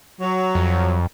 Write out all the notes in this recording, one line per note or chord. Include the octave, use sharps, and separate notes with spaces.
F#3
F2